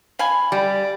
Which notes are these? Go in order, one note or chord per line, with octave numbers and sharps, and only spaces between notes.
F5 G#5 B5
G3 D5